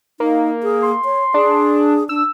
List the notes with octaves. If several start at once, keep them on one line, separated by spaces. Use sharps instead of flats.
A#3 D#4
G#4
C6
C#5
D4 G#4
D4 E6